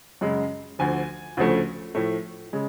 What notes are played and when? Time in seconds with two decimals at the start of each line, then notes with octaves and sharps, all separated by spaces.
0.21 F#2 C#3 G#3
0.79 D2 D3 F3 G#5
1.37 D2 C#3 F3 A3
1.95 A2 F3 A3
2.53 C#3 G#3